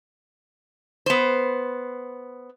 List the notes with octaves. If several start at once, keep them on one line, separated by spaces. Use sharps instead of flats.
B3 C5